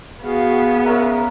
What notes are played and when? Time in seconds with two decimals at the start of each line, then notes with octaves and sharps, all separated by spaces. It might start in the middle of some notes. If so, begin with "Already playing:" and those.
0.23 B3 F#4 G#4 F5
0.84 C#4 A#4 E5 F5